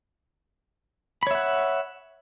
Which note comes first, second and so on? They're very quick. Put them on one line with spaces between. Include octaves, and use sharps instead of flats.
B5 C#5 E5 F#5